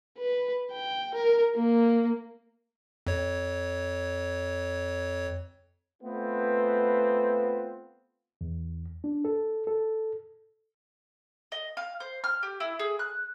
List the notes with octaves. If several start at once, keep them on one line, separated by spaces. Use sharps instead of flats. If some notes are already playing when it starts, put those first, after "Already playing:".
B4
G5
A#4
A#3
F2 C#5
A3 B3 C4 F4 B4
E2
D4
A4
A4
D#5
F5
C5
F6
G4
E4
G#4
F#6